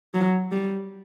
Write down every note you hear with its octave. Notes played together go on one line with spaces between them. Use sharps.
F#3
G3